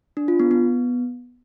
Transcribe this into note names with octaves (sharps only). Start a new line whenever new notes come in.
D4
F4
B3
B3